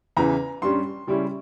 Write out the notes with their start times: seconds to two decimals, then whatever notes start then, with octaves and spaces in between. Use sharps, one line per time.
0.17 E2 C#3 E3 A#5
0.62 G2 G3 C#4 C6
1.07 C#3 G3 C#4 E4